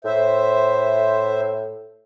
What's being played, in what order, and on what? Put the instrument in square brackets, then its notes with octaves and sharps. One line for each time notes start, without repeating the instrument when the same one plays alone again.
[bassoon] A2 [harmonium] C5 E5